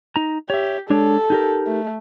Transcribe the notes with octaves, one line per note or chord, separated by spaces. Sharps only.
D#4 A#5
G4 C#5 E5
G#3 D4 A4 C#5
D#4 G4 A#4
A3